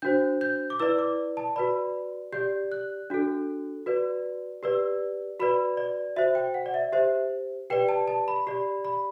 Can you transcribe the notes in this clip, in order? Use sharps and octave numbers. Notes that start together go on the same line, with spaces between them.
D4 F#4 C5 G6
G6
D6
E4 B4 D5 E6
D6
A5
F#4 B4 D5 B5
G4 D5 G6
F#6
D4 F#4 A4
F#4 B4 D5
G4 B4 D5 E6
F#4 B4 D5 B5
D5
F#4 C5 E5
G5
F#5
D5
E5
G4 C5 E5
G4 B4 D5 G5
A5
A5
B5
G4 D5 B5
B5